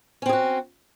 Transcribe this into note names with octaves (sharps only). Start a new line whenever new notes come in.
C4 C#4 F#4 G#4